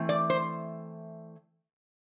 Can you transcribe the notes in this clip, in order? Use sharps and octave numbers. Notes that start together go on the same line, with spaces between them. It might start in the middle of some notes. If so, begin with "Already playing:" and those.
Already playing: E3 A3 C4
D5
C5